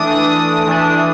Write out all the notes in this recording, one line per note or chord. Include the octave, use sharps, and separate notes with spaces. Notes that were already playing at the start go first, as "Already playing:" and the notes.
Already playing: E3 A3 D4 D#6
E3 A3 D4